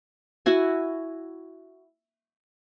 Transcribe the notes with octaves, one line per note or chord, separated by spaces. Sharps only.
E4 F#4 G#5